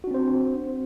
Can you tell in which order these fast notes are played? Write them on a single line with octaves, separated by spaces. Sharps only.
F#4 D4 C4 C5